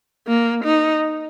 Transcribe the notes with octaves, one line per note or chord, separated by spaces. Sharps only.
A#3
D#4